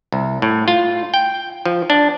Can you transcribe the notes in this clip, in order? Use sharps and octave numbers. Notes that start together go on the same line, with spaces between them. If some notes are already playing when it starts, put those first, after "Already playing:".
C2
A2
F4
G5
F3
D4